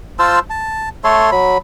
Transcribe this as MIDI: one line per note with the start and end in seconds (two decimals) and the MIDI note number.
0.19 0.39 65
0.19 0.39 72
0.19 0.39 81
0.19 0.39 88
0.50 0.89 81
1.04 1.30 57
1.04 1.30 69
1.04 1.30 73
1.04 1.30 84
1.32 1.58 54
1.32 1.58 83